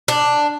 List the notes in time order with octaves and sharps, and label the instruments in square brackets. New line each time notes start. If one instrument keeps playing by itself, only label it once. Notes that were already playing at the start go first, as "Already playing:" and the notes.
[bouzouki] D4